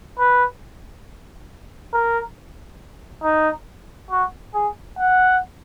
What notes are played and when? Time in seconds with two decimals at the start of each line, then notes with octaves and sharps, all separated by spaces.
0.19 B4
1.93 A#4
3.23 D#4
4.11 F#4
4.54 G#4
4.98 F#5